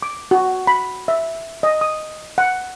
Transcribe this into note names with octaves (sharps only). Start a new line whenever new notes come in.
D6
F#4
B5
E5
D#5
D#6
F#5